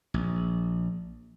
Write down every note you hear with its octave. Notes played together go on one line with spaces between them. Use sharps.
A#1